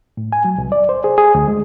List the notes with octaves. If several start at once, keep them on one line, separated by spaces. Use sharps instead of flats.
A2
G#5
F#3
C2
D5
C5
G#4
G#4
D2
G#3